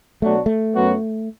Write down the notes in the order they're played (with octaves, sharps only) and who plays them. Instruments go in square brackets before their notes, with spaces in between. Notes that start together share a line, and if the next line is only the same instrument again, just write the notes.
[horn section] B2 F#3 D4 F#4 [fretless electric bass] A3
[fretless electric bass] A3
[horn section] F#2 F#3 B3 F#4